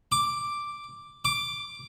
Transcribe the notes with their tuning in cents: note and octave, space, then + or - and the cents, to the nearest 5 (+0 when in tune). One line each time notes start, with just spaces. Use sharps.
D6 +0
D6 +5